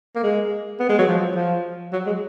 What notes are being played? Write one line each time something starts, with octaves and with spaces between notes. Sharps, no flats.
A#3
G#3
B3
G#3
F#3
F3
F3
F#3
G#3